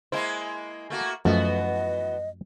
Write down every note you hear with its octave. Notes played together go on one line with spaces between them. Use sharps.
G#3 A#3 E4 C5
A3 A#3 F#4
F#2 E3 F3 A3 B3 F#4 D#5